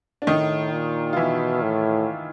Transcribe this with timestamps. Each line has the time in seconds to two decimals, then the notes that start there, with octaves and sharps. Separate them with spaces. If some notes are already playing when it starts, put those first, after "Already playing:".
0.22 D4
0.27 A2 D#3 D#4
0.72 A#2
1.13 F4
1.16 B2 E3 E4
1.62 A2